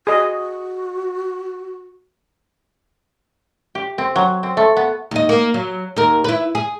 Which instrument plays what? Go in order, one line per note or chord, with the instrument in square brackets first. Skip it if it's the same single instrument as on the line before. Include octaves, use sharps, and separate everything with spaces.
[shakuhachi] F#4 [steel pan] G#4 D#5
[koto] G4
C4
F#3
C4
A3
B3
[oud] D#2 D#5
A#3
F#3
D#2 A#4
E4 B4
G#4